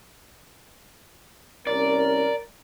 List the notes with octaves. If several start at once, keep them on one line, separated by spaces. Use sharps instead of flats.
C2 C#4 A#4 D5